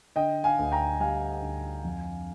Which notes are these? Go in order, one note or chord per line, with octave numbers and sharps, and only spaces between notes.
D3 D#5 G5
F5 G#5
D2
G5 A#5
G3 F5 G#5
D2
F2